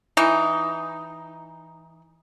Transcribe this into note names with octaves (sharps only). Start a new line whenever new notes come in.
E3 D#4